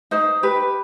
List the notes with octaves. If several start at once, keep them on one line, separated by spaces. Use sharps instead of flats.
D#4 C5
G4 B4